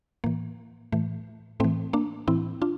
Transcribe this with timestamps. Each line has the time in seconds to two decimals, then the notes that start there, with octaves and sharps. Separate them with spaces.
0.24 A2 E3 A#3
0.92 A2 E3 A3
1.60 A2 E3 A3 C4
1.93 A#3 D4
2.28 A2 E3 C4 E4
2.62 D4 F4